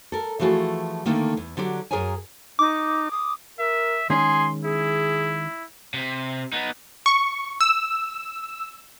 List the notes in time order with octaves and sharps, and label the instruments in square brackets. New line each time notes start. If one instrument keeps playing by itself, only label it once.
[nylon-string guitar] A4 A#4
E3 F3 A3 F#4 G#4
D3 D#3 A3 A#3
E2
D3 F#3 D4 G4
F#2 F3 G#4 A#4 C#5 G#5
[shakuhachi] D#4 [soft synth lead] D6
[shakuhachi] D#6
[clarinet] A#4 [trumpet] E5
[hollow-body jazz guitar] D#3 G#3 C#4 [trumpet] G#4 [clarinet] C6
[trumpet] E4 [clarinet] G#4
[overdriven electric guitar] C3
B3 D#4
[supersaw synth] C#6
E6